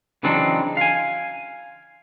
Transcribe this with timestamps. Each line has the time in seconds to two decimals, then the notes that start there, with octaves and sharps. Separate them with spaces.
0.23 C#3 E3 F#3 C4 D4 D#4
0.77 F5 G#5